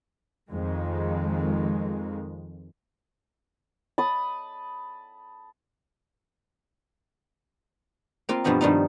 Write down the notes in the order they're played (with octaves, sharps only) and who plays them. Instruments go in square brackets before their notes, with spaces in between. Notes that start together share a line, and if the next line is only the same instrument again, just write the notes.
[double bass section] F2 D#3 G#3
[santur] A5 B5 D#6
[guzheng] A#3 C4 F4
G2 B2 F3 B3 D#5
G2 D#3 F3 G3 D#4